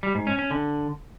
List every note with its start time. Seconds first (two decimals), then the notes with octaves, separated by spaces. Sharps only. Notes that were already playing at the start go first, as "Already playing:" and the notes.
0.03 G3
0.15 G#2
0.27 C#4
0.39 C#4
0.51 D3